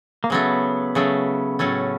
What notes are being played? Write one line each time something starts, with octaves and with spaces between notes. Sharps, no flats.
A#3
C#3 F#3 A3 B3
C#3 F#3 A3
A2 F#3 A3 C#4